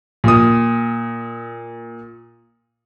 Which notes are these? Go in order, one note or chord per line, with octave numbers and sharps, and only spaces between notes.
A#2 D#6